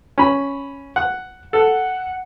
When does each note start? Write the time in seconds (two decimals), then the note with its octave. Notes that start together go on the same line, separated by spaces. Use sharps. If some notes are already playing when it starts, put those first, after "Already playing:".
0.18 C#4 B5
0.96 F#5
1.53 A4 F#5